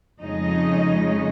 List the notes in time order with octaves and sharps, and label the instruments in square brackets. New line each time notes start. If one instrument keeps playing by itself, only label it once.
[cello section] F2 C#3 G#3 C#4 D#4 D#5